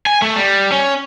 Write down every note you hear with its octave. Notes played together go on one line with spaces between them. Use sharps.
G#5
A3
G3
C#4